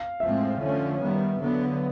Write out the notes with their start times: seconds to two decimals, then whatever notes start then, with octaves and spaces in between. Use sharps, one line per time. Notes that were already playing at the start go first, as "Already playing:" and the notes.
Already playing: F5
0.20 A2 F3 G#3 C4 E5
0.60 D3 F3 A3 C#4
0.99 D#3 G3 B3
1.38 D3 F#3 B3